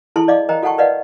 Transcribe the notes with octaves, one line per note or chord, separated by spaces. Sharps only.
E4 G#4 A4 A5 C6
D5 D#5 F5 D6
A#4 C5 D#5 G5 A#5
F#4 A4 F#5 G5 A5 C#6
A#4 B4 D5 D#5 F5 F#5